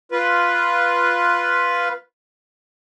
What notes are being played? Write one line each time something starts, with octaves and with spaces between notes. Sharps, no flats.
F4 B4